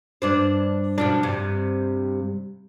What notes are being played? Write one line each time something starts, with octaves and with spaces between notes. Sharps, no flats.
G2 D4 C5
B2 F3 D4
G2 C3